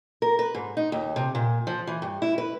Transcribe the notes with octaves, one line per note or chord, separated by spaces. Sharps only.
A#4
B4
G#2
D#4
D#2
C3
A#2
F3
E3
G2
E4
B4